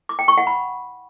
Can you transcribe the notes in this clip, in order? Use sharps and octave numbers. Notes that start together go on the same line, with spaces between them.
D6
G5
C#6
F#5
B5